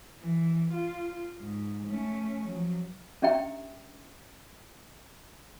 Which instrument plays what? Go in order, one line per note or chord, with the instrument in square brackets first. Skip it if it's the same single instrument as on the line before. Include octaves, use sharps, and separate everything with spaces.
[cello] E3
F4
G#2
A3 C#4
F3 F#3
[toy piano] C#4 D4 G4 E5 G5 A#5